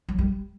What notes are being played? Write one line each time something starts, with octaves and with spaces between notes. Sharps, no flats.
F#3
G3